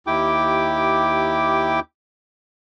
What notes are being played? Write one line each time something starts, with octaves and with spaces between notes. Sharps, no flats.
D#2 E4 G4 G5 D6